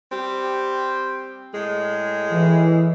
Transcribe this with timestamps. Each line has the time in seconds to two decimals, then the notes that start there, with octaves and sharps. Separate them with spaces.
0.12 G3 C4 G4
1.55 A2 G#3
2.31 E3